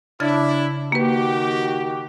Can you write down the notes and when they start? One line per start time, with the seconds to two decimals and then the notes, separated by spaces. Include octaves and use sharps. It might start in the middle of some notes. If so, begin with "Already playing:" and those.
0.20 C#3 D4 E4 G#6 A6
0.92 D#3 A#3 F#4 G4 B4